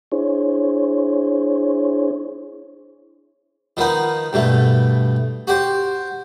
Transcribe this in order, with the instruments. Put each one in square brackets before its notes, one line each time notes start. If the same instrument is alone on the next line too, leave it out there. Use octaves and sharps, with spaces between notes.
[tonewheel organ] D4 E4 G#4 C5 C#5
[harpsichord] D#3 F3 B3 D#4
G2 B2 A3
F#4 G4 C5